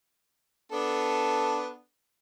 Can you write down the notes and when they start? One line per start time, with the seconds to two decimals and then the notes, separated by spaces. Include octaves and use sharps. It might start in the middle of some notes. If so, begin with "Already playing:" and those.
0.72 B3 D4 A4